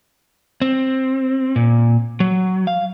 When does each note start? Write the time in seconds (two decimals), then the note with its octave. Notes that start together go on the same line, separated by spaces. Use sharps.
0.62 C4
1.56 A#2
2.20 F#3
2.67 F5